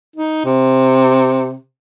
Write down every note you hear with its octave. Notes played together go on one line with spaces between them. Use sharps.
D#4
C3